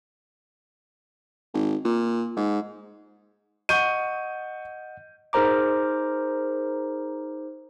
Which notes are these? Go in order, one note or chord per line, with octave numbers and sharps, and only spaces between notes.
G#1
A#2
G#2
D#5 F#5 C#6 G6 D#7
D#4 G#4 A#4 C5 A#5 D6